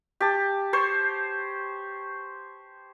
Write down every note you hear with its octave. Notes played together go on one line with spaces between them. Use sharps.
G4 A5
C5 C#5